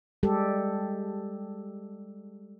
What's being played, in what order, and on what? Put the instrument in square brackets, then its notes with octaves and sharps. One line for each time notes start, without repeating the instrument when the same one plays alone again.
[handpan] G3 G#3 G4 A4